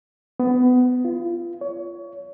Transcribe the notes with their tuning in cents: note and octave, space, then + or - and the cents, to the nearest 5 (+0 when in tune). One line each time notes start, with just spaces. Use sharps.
B3 +20
F4 -25
C#5 +25